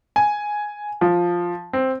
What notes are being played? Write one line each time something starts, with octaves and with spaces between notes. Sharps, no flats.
G#5
F3
C4